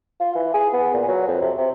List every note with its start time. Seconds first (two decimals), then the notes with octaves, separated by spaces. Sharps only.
0.20 F4
0.35 E3
0.54 G#4
0.73 B3
0.94 A#2
1.08 F#3
1.28 F2
1.41 C3
1.58 C3